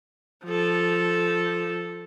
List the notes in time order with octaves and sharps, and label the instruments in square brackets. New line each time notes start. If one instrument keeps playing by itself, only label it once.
[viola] F3 A4